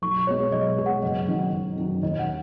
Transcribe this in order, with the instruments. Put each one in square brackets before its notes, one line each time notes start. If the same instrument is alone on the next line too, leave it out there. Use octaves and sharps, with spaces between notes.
[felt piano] B1 [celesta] C#6
[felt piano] B2 G#3 B3 G#4 [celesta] C#5
[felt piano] B1 [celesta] D#5
[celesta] D#5
[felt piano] B2 G#3 B3 G#4
[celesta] F#5
[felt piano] F#1 [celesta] D#5
[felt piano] F#2 D#3 F#3 D#4
F#1
F#2 D#3 F#3 D#4
[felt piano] D#2 [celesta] D#5
[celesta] F#5